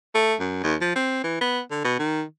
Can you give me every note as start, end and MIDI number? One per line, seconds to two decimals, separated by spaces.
0.15 0.35 57
0.40 0.63 42
0.63 0.76 39
0.81 0.91 53
0.96 1.21 60
1.24 1.40 52
1.41 1.61 59
1.71 1.83 50
1.85 1.97 47
1.99 2.24 51